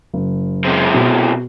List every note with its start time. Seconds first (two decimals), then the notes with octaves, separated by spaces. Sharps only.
0.13 F#1
0.65 C3 G#3
0.94 B2